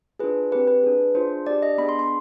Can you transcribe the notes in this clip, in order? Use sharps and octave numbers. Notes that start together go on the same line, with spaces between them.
D4 F4 G#4 B4
C4 G4 B4
B4
D4 G#4
D4 F4 G#4 C5
D4 G4 D5
D#5
B3 D4 G#4 B5
C6
C6